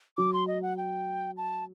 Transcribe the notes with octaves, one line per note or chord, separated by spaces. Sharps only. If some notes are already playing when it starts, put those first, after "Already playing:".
F#3 D6
C6
D#5
F#5
G5
A5